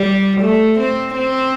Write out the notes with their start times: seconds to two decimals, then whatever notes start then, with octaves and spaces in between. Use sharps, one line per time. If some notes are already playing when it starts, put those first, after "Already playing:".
Already playing: G3
0.41 A3
0.79 C4
1.16 C4